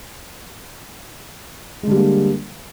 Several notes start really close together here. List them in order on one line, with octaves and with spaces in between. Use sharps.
G#3 D3 G3 A#3